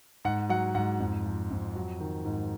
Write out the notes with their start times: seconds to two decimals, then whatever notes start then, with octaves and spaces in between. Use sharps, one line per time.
0.25 G#2 F#5
0.49 F#3 F#5
0.75 G#2 F#5
1.00 F2
1.26 F3
1.51 F2
1.76 F#3
2.00 D#3
2.25 G#2